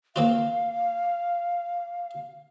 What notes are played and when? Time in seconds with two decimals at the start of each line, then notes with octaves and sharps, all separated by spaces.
0.16 A#3 C4 F4 F5